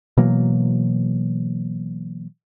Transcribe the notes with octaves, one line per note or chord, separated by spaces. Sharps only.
B2 E3 F#3 A#3